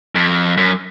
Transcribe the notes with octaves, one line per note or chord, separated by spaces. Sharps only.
F2
F#2